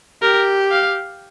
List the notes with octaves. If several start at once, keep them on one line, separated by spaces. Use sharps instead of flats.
G4 A#4
F5